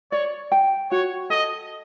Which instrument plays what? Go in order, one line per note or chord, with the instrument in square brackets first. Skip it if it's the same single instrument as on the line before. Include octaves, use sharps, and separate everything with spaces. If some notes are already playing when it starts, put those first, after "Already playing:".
[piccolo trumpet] C#5 [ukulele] D5
[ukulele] G5
[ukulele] F#4 [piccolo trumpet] C#5
[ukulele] A4 [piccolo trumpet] D#5